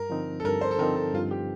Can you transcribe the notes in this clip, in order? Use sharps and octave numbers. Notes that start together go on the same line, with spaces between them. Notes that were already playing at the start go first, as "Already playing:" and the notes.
Already playing: G2 A#4
D3 F3 C4 D#4
A4
G2 A#4
C5
A4
D3 F3 C4 D#4 A#4
A4
G2 F4
G4